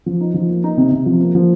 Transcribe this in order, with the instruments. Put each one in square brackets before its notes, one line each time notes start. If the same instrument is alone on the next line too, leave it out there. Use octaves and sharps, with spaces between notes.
[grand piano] F3
D#4
F3
A#3
D#4
C3
C3
F3
A#3
F3